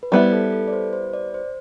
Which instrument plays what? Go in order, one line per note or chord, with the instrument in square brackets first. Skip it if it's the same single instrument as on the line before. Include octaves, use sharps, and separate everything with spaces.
[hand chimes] B4
[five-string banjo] G3 B3 E4 [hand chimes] C5
[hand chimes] A4
A4
D5
C5
C5
D5
C5